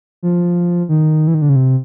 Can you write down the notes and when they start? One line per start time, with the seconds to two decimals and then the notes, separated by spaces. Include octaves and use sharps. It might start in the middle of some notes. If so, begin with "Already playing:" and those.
0.23 F3
0.89 D#3
1.27 E3
1.34 D#3
1.42 D3
1.49 C#3
1.56 C3